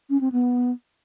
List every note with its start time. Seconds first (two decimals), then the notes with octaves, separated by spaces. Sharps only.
0.10 C#4
0.21 C4
0.32 B3